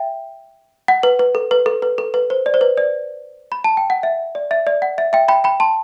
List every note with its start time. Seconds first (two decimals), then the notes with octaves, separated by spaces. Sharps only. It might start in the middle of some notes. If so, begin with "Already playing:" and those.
Already playing: E5 G5
0.88 F#5
1.03 B4
1.19 B4
1.35 A4
1.51 B4
1.66 A4
1.82 B4
1.98 A4
2.14 B4
2.30 C5
2.46 D5
2.54 C5
2.61 B4
2.77 D5
3.52 B5
3.64 A5
3.77 G5
3.90 F#5
4.03 E5
4.35 D5
4.51 E5
4.67 D5
4.82 F#5
4.98 E5
5.13 E5 G5
5.28 G5 B5
5.44 G5 B5
5.60 A5 C6